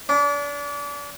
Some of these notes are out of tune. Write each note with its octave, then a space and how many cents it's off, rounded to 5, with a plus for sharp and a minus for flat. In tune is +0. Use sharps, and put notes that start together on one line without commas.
D4 -35